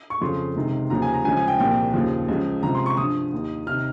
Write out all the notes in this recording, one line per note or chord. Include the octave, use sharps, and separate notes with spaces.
C#6
F2 C#3 F3 C6
C#2 C3 D#3
D#2 C#3 F3 A#5
G#5
A#5
C#2 C#3 F3 G#5
G#5
G5
C2 A#2 F3 G5
D#2 C#3 F3
C#2 C#3 F3
C#2 C3 F3 A#5
C6
C#6
G2 F3 D#6
D#2 D#3
C3 D#3 F6